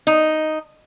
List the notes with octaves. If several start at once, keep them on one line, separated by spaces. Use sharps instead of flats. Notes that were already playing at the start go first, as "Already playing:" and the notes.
D#4